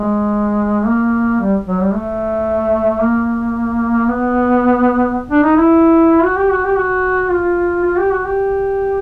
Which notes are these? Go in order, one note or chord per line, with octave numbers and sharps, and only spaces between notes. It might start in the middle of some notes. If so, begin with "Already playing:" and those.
Already playing: G#3
A#3
G3
F#3
G3
A3
A#3
B3
D4
D#4
E4
F#4
G4
F#4
G4
F#4
F4
F4
G4
F#4
G4